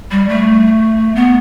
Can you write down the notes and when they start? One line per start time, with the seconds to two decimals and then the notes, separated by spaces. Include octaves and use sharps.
0.11 G3
0.29 A3
1.15 B3